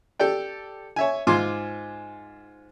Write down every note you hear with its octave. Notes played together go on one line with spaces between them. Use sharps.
G4 A4 D5 G5
C#5 E5 G#5
G#2 F4 G#5 C6 D6